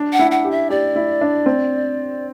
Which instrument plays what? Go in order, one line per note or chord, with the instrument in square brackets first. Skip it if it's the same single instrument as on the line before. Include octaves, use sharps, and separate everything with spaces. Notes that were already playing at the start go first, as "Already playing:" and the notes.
Already playing: [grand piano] D4
[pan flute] F#5
[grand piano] E4
[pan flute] F#5
[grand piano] G4
[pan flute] E5
[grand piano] G4 [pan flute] D5
[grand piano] E4
D4
C4